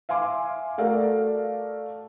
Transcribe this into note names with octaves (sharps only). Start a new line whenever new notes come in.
E5 F5 G#5 C6 D6
A3 F#4 A4 A#4 D5 F5